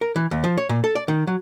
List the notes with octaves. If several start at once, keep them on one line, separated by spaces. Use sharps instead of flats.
A#4
E3
D#2
F3
C#5
A#2
A4
D5
D#3
F#3